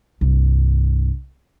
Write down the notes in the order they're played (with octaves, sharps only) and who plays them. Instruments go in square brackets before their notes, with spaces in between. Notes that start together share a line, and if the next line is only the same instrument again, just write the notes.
[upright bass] C2 G2